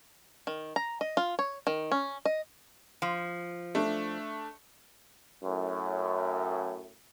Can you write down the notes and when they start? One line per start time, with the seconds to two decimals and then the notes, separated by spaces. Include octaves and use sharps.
0.47 D#3
0.76 A#5
1.01 D#5
1.17 F4
1.39 C#5
1.67 D#3
1.92 C#4
2.25 D#5
3.02 F3
3.75 A3 D4
5.44 F#2 A2